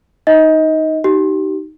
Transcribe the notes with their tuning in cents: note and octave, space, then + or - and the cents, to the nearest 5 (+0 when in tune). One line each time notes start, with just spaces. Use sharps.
D#4 +0 D#5 +25
D#4 +0 G4 -35